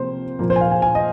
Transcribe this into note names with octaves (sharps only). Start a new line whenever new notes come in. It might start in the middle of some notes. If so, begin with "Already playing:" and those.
Already playing: C3 F3 A#3 C5
A#2 F3 A#3
C5
G#5
F5
G#5
G#5
D#5